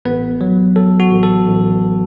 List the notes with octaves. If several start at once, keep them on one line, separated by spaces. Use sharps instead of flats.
A1 B3 B4
F#3
F#3 A4
F#4
A1
A4
A1